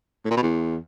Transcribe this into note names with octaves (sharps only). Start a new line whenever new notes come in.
A2
A#2
B2
E2